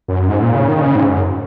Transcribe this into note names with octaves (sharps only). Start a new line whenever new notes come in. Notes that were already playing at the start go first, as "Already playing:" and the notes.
F#2
G#2
A#2
C#3
D#3
C#3
G#2
F#2